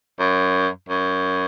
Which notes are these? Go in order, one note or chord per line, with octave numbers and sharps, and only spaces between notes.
F#2
F#2